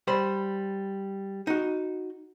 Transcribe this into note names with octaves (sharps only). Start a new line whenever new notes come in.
G3 C5 B5
D#4 F#4